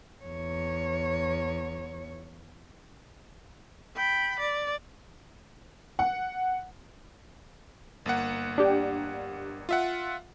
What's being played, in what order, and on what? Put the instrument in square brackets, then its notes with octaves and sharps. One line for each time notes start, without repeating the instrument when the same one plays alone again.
[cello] E2 C#5
[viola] G5 B5
D5
[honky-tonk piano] F#5
[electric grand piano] G1 A#3 F#5
[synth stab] D4 G4
[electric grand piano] F4 E5 F#5